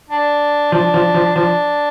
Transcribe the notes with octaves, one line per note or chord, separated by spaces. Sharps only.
D4
F3 D4
F3
F3
F3 D4